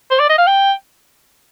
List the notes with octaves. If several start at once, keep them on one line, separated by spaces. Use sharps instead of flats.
C5
D5
D#5
F5
G5